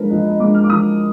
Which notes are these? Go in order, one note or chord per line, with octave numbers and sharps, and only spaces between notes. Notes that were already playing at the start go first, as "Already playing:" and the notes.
Already playing: F3 G#3 D4 A#4 B4
F3 D#5
D#5
G#3 D4 D6
F6
D6
F3 D#6